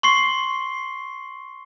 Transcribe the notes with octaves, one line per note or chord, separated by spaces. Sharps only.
C6 C#6 C7 G7